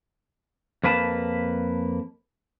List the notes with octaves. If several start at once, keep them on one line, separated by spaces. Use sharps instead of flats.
F2 A#3 B4 G#5 A5